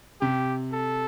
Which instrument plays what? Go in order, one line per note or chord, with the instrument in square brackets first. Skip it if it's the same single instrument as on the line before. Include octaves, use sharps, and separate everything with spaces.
[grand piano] C3 [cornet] G4
[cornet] A4